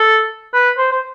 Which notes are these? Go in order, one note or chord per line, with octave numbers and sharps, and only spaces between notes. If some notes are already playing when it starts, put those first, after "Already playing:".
Already playing: A4
B4
C5
C5